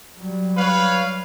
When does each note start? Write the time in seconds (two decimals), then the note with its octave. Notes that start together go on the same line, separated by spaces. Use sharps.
0.19 F#3 G3
0.57 B4 C#5 F5